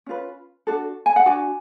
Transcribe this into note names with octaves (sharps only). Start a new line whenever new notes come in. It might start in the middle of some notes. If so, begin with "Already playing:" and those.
C#4 F4 B4
D4 F#4 A4
G#5
F#5
D4 F#4 G#5